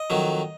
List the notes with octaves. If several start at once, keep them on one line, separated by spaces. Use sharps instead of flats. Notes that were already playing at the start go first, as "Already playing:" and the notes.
Already playing: D#5
F2 D#3 F#3